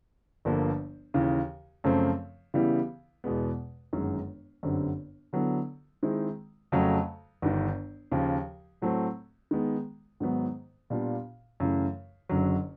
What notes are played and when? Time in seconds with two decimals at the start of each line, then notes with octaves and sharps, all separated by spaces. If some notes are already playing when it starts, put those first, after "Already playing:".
0.45 G1 G2 D3 F3 A#3
1.14 D#2 C#3 E3
1.84 F#2 C#3 F3 A3 C4
2.54 C#3 E3 G3 B3 E4
3.24 E2 B2 G#3 B3
3.93 G1 F#2 D#3 G#3
4.63 G1 F#2 D3 G3 C4
5.33 D3 F#3 B3 E4 A4
6.03 D#3 G#3 C4 E4
6.72 F2 C#3 F#3 A3
7.42 G1 G2 D#3
8.12 D#2 C#3 F3
8.82 A2 F#3 A3 C4
9.51 D#3 G#3 B3
10.20 G#2 D#3 F#3 B3
10.90 A#2 G3 B3 D4 F4
11.60 F#2 C#3 E3 A3
12.30 F#1 F#2 D3 F#3